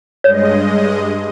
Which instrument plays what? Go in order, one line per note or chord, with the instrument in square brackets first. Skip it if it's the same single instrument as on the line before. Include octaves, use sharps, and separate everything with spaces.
[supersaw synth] G2 G#3 D#5 [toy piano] C#5